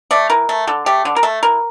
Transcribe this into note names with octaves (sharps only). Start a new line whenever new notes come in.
A3 D5
E3 A#4
A3
D3 A4
A3 G4
D3
A#4
A3 A4
E3 A#4